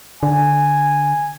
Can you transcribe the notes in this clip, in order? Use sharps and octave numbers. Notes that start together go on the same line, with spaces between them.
D3 G#5